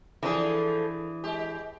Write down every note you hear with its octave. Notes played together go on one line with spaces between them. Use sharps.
E3 F3 A3 D4 G#4
G#3 G4